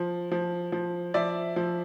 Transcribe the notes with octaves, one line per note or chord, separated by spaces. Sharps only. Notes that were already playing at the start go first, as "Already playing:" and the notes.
Already playing: F3
F3
F3
F3 D5 E5
F3